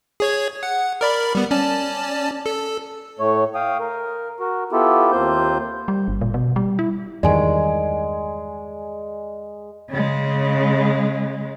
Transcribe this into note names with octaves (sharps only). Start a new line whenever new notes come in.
G#4 C#5 G#6
F#5
A#4 D5 B5
G3 B3
C#4 D5 A5
A4
A2 A3 C#5
F5 G5 D#6
A#4
F#4 A#4
B3 E4 F4 G4 A4
D#2 A#3 C4 F4 C5 G6
G3
G1
A#2
B2
G3
E4
E2 G2 D#3 G#3 D5 G#5
C#3 G#3